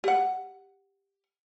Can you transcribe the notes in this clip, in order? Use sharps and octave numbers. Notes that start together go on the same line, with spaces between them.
G4 F#5